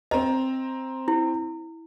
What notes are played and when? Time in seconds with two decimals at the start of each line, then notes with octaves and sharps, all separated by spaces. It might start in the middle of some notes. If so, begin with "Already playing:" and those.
0.11 C4 D#5 A#5
1.08 E4